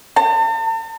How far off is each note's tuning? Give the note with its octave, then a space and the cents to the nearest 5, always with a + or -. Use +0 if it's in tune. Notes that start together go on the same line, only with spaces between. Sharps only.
A5 +45